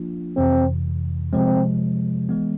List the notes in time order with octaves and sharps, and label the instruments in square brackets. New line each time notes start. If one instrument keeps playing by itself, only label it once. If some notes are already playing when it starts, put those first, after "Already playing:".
Already playing: [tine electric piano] F3 A#3 D4 F4
[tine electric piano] F2 C3 E3 [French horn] C4
[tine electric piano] C3 F3 G#3 [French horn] C4
[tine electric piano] E3 G#3 B3